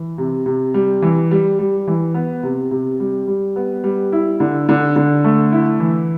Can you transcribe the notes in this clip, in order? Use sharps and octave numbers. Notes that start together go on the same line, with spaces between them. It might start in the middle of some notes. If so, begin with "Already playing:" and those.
Already playing: E3
C3
C3
G3
E3
G3
G3
E3
B3
C3
C3
G3
G3
B3
G3
E4
D3
D3
D3
A3
E4
E3